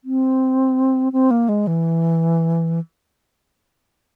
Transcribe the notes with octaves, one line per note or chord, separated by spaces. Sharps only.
C4
C4
A#3
G#3
E3